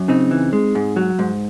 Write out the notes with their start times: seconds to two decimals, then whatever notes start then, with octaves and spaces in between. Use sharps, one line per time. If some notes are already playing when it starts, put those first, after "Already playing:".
Already playing: F#2
0.08 C#3 C4 D#4
0.31 E3
0.53 G#3
0.75 G#2
0.96 F#3
1.19 G#2